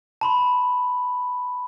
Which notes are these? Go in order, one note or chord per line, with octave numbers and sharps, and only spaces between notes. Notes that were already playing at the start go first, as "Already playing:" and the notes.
A5 B5 C6